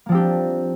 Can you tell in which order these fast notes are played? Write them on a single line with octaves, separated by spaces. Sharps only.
A#3 F3 C4 G4 D4